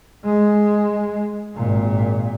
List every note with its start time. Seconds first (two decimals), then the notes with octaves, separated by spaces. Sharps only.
0.25 G#3
1.56 G#1 A#2